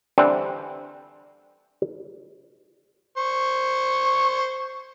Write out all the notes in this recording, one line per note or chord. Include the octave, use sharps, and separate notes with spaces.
D3 E3 G3 C4 D4
C5 C#6